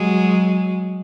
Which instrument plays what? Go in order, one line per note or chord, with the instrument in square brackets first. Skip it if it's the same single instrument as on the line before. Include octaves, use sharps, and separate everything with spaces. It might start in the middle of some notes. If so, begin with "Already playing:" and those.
Already playing: [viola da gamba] F#3 G#3